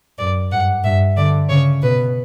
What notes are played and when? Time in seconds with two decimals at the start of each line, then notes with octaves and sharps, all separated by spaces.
0.19 F#2 D5
0.51 G2 F#5
0.84 G2 E5
1.17 D3 D5
1.49 C#3 C#5
1.82 B2 B4